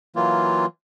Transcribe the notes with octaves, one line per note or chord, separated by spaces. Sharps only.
E3 F#3 A#3 F4